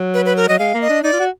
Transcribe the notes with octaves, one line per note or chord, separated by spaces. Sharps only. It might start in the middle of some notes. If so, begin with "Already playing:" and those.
Already playing: F#3
B4
B4
A#4
F#3 D#5
G#3 F5
A#3
D#5
D4
D#4 D5
F4
F#4